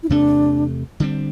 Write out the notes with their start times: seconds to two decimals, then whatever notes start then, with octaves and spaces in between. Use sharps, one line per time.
0.03 E4
0.10 E2 C3 A3 D4
1.00 D3 G3 C4